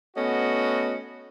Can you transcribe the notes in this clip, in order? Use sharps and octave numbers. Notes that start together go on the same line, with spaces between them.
A3 B3 C#4 F#4 D#5